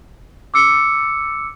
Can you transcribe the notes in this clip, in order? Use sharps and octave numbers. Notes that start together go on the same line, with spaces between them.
D6 E6 C#7